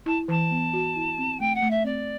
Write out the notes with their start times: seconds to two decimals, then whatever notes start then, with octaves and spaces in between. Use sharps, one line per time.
0.06 E4 A5
0.28 E3 A5
0.51 B3
0.73 F#4
0.96 E4
1.18 C4
1.40 A3 G5
1.55 F#5
1.62 A3
1.70 E5
1.85 C4 D5